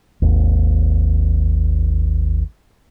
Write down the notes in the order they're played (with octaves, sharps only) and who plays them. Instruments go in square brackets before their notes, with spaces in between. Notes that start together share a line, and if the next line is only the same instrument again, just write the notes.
[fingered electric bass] G#1 D#2